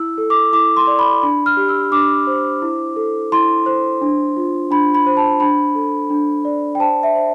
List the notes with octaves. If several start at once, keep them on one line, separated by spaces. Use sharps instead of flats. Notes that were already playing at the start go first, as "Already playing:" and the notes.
Already playing: E4 E6
A4
D6
E4 D6
C6
D5
B5
D4 B5
F6
G4
E6
D4 D6
C5
E4
A4
E4 C6
C5
D4
F4
D4 B5
B5
C5
A5
D4 B5
A4
D4
D5
G5
C5 A5
E5
C5